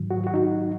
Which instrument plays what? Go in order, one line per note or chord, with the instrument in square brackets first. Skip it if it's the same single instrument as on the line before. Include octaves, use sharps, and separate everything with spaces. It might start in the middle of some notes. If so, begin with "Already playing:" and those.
Already playing: [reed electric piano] G#2 D#3 F#3
F#4
F#4
D#4